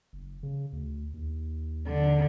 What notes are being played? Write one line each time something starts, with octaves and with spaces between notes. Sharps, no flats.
F#1
C#3
D2
D#2
D3